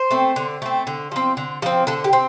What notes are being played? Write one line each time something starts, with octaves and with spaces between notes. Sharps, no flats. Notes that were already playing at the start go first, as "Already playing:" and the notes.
Already playing: C5
A3 C4
D3
A3 C4
D3
F3 C4
D3
F3 C4
D3 A4
G4
C4